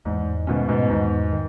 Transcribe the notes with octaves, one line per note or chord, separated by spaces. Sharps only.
E2 G#2
G#2 B2 D#3 A3 C#4
G#2 B2
E2 G#2
D#3